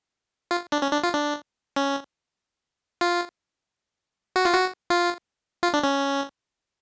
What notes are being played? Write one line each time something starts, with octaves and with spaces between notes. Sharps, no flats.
F4
D4
C#4
D4
F4
D4
C#4
F4
F#4
F4
F#4
F4
F4
D4
C#4